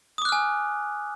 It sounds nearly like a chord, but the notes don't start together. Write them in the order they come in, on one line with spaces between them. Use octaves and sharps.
D#6 D6 F#6 F6 G#5